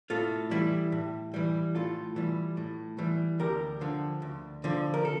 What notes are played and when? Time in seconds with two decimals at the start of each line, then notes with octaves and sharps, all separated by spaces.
0.10 A2 F4 A4
0.51 E3 G3 E4 G4
0.92 A2
1.34 E3 G3
1.75 A2 F4 A4
2.16 E3 G3
2.57 A2
2.98 E3 G3
3.40 D2 G4 A#4
3.81 D3 F3
4.22 D2
4.64 D3 F3
4.94 A#4
5.05 A4